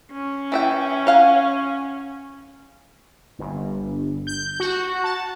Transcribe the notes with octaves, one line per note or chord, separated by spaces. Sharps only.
C#4
E3 E5 G5
C#5 F5 F#5
G1
G6
F#4
A5